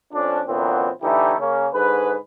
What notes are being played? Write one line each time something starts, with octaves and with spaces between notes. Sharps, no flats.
F2 F3 C#4 D4
A#2 D3 E3 F#3 B3 C4
D3 E3 A3 D#4 E4 G4
C#3 A#3 C#4
G#2 D3 G#4 B4